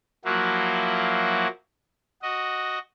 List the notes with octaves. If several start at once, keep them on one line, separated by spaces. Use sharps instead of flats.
F3 F#3 A#3 E4 F#4
F#4 D#5